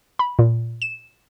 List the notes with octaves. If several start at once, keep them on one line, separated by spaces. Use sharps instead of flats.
B5
A#2
E7